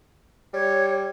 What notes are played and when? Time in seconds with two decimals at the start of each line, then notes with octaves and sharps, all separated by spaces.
0.53 G3 C#5